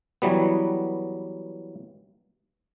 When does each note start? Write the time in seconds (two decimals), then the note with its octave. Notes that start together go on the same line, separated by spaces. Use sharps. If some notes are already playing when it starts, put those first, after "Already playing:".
0.22 E3 F#3 G3 B3